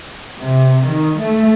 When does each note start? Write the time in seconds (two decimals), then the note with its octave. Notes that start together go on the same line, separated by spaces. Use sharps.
0.39 C3
0.87 D#3
1.20 A3